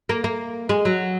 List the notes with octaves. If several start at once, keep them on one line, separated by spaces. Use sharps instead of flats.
A#3
A#3
G#3
F#3